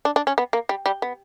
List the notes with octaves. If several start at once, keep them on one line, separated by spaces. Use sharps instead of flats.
D4
D4
C#4
B3
A#3
G3
G3
B3